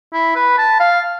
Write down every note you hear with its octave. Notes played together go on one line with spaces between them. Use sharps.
E4
B4
A5
F5